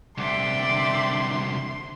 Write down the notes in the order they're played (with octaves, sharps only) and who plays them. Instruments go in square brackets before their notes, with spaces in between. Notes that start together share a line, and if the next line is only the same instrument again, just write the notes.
[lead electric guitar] C2 D3 [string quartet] D5 E5 G5 [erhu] C6